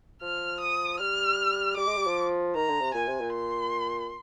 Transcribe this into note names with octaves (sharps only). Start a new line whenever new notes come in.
F3 F6
D#6
G3 F6
G3 D6
G#3
G3
F3
D#3 A#5
D3
C3
A#2 G#5
C3
A#2
C6